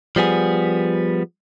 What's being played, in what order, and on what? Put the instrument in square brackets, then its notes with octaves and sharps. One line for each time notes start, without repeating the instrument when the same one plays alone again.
[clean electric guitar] F3 G3 B3 G#4